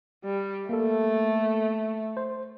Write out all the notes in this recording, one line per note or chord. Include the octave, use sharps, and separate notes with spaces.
G3
A3 A#3 A4
C5